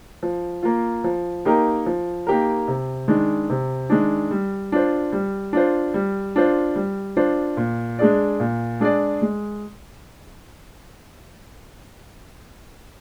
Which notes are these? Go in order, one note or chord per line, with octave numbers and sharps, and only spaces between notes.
F3
A#3 F4
F3
A#3 D#4 G4 A#4
F3
A#3 D#4 G4 A#4
C3
D#3 G#3 D4
C3
D#3 G#3 D4
G3
D4 F4 C5
G3
D4 F4 C5
G3
D4 F4 C5
G3
D4 F4 C5
A#2
G#3 D4 G#4 D5
A#2
G#3 D4 G#4 D5
G#3